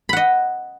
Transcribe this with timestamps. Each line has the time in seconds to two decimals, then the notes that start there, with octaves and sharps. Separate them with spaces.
0.09 B5
0.13 F#5
0.17 D#5